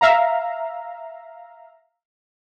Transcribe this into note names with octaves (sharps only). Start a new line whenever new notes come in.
E5 F5 A#5